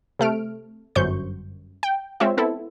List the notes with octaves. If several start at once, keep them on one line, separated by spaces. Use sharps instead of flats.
C3 A3 F6 D7
G1 F#2 C5 C#6 G6
G5
G#3 C4 F4 C#5 E5
B3 C4 E4 A4